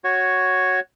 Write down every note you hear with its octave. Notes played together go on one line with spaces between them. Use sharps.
F#4 C#5